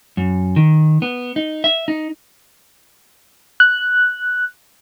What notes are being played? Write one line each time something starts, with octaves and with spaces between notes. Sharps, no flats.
F#2
D#3
B3
D#4
E5
D#4
F#6